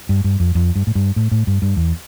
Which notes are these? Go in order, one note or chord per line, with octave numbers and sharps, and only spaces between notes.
G2
G2
F2
F2
G2
A2
G2
A2
A2
G2
G2
E2